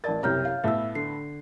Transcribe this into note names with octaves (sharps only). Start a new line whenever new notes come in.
A1 A#4 D5 A5 A6
F#1 C2 C3 C#5 A#5 F6 G6
F5
A2 A3 B3 E5 E6
D3 C7